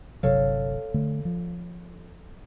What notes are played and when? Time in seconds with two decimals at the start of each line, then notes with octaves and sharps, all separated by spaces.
0.23 G1 C3 F#3 A4 C#5 F5
0.94 D3 A3
1.25 F3